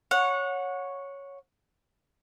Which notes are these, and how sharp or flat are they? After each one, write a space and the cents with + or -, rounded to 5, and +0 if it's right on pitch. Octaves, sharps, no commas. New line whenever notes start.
C#5 +0 F#5 -25